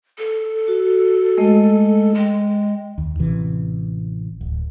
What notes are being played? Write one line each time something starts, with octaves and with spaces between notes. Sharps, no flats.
A4
F#4
G#3 A3 D#5
G#3 D#5 G5
D#2
A1 C3 E3
D1